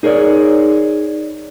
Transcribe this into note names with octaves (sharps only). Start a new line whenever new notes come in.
D#4 G#4 A#4 C#5 D5